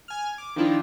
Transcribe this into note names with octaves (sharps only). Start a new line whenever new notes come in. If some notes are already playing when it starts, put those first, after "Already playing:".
G#5 F6
D6
D#3 F3 D4 E4 F4